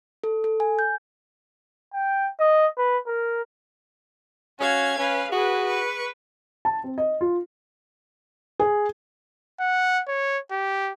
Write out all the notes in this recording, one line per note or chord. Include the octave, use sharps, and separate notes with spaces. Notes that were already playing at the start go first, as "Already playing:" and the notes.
A4
A4
G#5
G6
G5
D#5
B4
A#4
C#4 F#4 F5 G#6
C#4 B4 F5
F#4 G#4 B4
B4 C#6
A5
C4
D#5
F4
G#4
F#5
C#5
G4